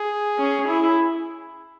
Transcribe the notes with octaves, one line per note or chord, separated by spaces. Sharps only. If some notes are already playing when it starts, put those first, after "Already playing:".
Already playing: G#4
C#4
E4